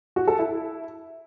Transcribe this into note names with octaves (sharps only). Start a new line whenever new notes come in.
F#4
A4
E4